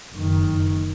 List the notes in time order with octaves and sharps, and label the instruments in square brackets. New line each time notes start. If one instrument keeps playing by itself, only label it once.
[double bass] F#1 D#3